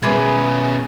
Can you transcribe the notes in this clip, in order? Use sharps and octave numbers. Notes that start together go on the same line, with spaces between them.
B2 G#3 C#4 G#4 B4 E5 D6